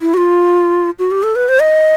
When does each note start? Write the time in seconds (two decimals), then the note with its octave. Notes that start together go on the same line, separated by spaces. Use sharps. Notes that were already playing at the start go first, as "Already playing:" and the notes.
0.01 E4
0.14 F#4
0.17 F4
0.99 F#4
1.11 G4
1.23 A4
1.36 B4
1.49 C5
1.60 D#5